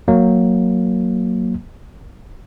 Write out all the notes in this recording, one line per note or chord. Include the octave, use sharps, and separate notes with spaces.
F#3 A#3